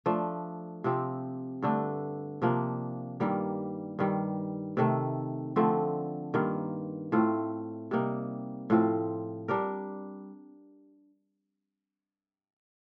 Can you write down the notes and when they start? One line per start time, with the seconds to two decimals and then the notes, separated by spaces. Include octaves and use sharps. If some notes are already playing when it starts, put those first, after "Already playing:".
0.06 F3 A3 D4
0.84 C3 F3 C4 G4
1.62 G2 D3 A3 D4
2.42 C3 F3 A#3 D4
3.20 G2 D#3 G3 A#3
3.99 G2 D#3 G3
4.77 C3 D#3 A3
5.56 D3 F3 A3 C4
6.34 G2 D#3 A#3 F4
7.12 A2 A3 C4 F4
7.91 C3 G3 A#3 D#4
8.70 A2 F3 C4 F4
9.48 G3 D4 G4 A#4